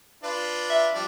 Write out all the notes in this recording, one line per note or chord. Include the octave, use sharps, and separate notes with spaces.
D4 F4 B4
E5
F3 G3 D4